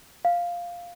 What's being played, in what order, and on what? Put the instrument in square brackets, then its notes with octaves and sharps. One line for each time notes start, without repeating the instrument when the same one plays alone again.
[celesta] F5